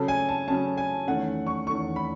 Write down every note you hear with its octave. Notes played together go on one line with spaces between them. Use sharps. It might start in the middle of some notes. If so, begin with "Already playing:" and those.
Already playing: C#3 F#3 C#4 A4
G#5
A5
C#3 F#3 C#4 A5
G#5
E2 D#3 A3 C#4 F#5
C#6
E2 D#3 A3 C#4 C#6
B5